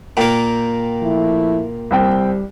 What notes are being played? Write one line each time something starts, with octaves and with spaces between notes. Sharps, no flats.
A#2 A#3 G5
F3 A3 E4
C2 G3 C4 G5